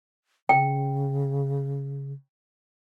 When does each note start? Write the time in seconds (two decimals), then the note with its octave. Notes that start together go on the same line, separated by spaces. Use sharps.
0.49 C#3 G5